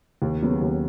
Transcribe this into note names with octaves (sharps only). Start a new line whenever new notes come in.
D#2
C#3 F#3 B3
D#2